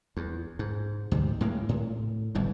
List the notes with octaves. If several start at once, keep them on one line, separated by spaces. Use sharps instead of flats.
E2
G#2
D2 G#2 C3
A2 G#3 A#3
A2
G1 C2 G#2